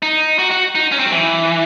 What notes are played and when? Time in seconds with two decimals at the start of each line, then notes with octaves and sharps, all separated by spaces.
0.02 D#4
0.39 F#4
0.51 F#4
0.75 D#4
0.92 C#4
0.99 C4
1.06 F#3
1.12 E3